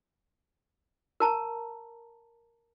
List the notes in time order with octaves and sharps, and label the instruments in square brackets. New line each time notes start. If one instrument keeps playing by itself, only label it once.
[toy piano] A#4 A5 A#5